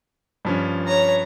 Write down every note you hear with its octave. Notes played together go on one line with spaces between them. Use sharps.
G2 F3 C#4
C#5 A#5